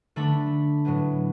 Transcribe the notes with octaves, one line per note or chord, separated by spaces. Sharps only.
D3 A3 D4 B5
A2 F#3 B3